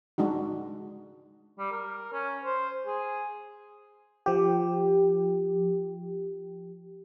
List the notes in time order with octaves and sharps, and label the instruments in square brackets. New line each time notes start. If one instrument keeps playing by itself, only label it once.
[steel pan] G#3 D4 D#4 F#4
[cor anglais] G3
A#4
C#4
C5
G#4
[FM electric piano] F3 G4